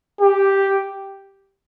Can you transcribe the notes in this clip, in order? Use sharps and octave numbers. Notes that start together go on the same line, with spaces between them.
G4